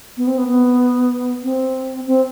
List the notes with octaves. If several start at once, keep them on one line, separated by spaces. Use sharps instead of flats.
B3
C4
B3
B3
C4
C4